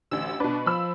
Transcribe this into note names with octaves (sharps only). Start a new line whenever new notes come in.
A1 D2 E6
B2 D4 B4
F3 B5 E6